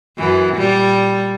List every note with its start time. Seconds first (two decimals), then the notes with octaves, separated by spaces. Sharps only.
0.17 F#2 E3
0.57 A#2 G3